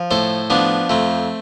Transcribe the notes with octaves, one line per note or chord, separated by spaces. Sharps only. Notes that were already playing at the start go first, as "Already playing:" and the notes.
Already playing: F3
A2 A4 C5
F3 B3 D4
F2 A3 C4